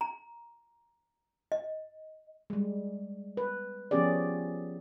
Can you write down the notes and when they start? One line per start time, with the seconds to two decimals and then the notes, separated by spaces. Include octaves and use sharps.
0.01 A#5
1.52 D#5
2.50 G3 G#3
3.37 B4
3.91 F3 B3 C#4 G4 G#4 D5